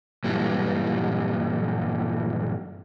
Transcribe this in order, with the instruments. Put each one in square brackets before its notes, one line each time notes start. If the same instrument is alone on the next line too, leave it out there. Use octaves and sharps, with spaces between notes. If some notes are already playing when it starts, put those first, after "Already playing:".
[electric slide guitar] G2 A#2 E3 F#3 G3